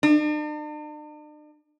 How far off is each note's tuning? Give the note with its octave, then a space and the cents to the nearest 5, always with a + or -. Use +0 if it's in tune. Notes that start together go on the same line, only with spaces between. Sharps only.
D4 +45